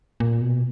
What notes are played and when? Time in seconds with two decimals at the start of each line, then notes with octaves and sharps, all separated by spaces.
0.20 A#2
0.41 B2